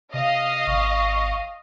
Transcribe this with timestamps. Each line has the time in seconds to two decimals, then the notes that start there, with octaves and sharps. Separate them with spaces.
0.14 C3 D#5 F5
0.67 G#1 C#6